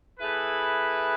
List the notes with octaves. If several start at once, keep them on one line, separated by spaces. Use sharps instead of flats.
A3 E4 G#4 B4